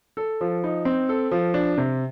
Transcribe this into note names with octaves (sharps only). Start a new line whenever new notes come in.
A4
F3
D#4
C4
A4
F3
D4
C3